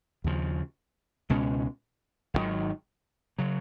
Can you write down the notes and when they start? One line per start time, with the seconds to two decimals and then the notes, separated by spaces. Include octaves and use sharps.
0.24 D#2 C#3 F3
1.30 C#2 B2 G#3 C#4
2.34 G#1 F#2 D#3 F#3
3.38 C#3 F#3